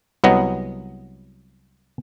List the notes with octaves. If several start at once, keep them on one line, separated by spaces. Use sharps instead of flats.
C2 F#3 B3 D#5